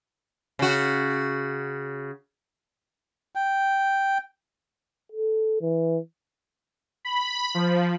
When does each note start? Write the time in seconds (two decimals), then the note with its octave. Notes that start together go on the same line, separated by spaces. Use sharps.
0.59 C#3 F#4
3.35 G5
5.12 A4
5.61 E3
7.05 B5
7.54 F3